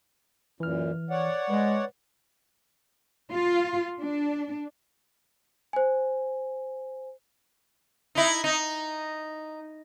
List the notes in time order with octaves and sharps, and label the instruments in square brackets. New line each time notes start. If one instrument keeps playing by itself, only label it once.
[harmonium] F#2 A#2 [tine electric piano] E3 F6
[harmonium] C#5 D5 F#5
[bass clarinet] G#3 [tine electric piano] B4
[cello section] F4
D4
[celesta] C5 G#5
[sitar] D#4 E4
D#4